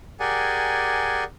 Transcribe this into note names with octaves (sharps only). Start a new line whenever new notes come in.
G4 G#4 A#4 D5 F#5 G#5